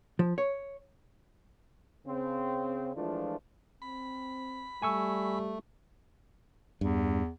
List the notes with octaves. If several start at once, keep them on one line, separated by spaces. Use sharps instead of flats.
F3
C#5
C#3 C4
E3 F3 G#3 A3 D4 F4
C4 B5
G3 A3 G#5 C#6 E6
E2 G2